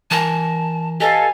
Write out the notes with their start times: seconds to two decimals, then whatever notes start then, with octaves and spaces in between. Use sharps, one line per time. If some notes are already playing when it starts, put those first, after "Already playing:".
0.11 E3 A#4 G#5 A5
1.00 G4 A4 B4 D#5 F5 G#5